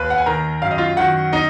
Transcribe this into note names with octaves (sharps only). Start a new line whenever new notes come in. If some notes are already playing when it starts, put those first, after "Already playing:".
Already playing: D#2 B4 B5
F#5
G#5
D#3 A#4 A#5
F#2 F5
D#5
F4 F5
D#3 F#4 F#5
D#4 D#5